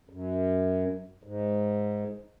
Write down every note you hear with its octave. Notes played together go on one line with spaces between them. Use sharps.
F#2
G#2